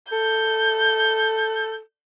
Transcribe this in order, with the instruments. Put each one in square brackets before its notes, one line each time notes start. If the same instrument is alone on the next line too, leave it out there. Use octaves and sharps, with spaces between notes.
[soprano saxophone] A4 [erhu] G6